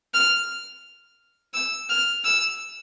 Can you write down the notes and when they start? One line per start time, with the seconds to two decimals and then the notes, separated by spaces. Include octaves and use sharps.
0.14 F6
1.54 E6
1.89 F6
2.24 E6